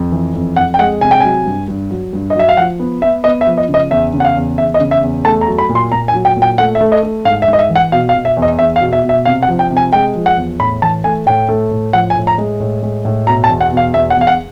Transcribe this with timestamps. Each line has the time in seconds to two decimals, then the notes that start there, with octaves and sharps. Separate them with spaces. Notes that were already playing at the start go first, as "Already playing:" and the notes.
Already playing: F2
0.12 E3
0.34 F2
0.56 F2 F#5
0.74 G5
0.79 G#3 F#5
1.01 C3 G#5
1.11 G5
1.20 F#3 G#5
1.46 G2
1.68 G2
1.91 F#3
2.13 G2
2.30 D#5
2.35 F#3 E5
2.49 F5
2.57 F3 F#5
2.80 B3
3.02 B3 E5
3.24 B3 D#5
3.41 E5
3.47 F3
3.57 D#5
3.69 C#3
3.74 D#5
3.90 E2 E5
4.14 C#3
4.20 F#5
4.25 F5
4.36 E2
4.58 E2 E5
4.74 D#5
4.80 C#3
4.91 E5
5.03 E2
5.25 A3 A5
5.41 A#5
5.47 F#3
5.58 B5
5.69 A#2
5.75 C6
5.92 A#2 A#5
6.08 G#5
6.14 F#3
6.25 G5
6.36 A#2
6.42 G5
6.58 A3 F#5
6.75 E5
6.81 A3
6.92 D#5
7.03 A3
7.25 G#2 F5
7.42 E5
7.48 G#2
7.53 D#5
7.59 E5
7.70 E3
7.75 F#5
7.92 B2 F5
8.09 F5
8.15 B2
8.25 E5
8.37 E2
8.42 D#5
8.59 E2 E5
8.76 F5
8.81 B2
8.93 E5
9.04 B2
9.09 E5
9.25 C3 F5
9.43 F#5
9.48 F3
9.59 G5
9.70 C3
9.77 G#5
9.93 G#3 G5
10.15 F3
10.26 F#5
10.37 E2
10.60 A2 B5
10.82 E3 A5
11.04 A3 G#5
11.26 A2 G5
11.49 A3
11.71 A2
11.93 F3 F#5
12.10 G#5
12.16 A2
12.27 A#5
12.38 G#3
12.60 A2
12.82 G#3
13.05 A2
13.27 B2 A#5
13.44 A5
13.49 E2
13.61 F#5
13.72 B2
13.77 F5
13.94 E2 E5
14.10 F#5
14.17 E2 F5
14.27 F#5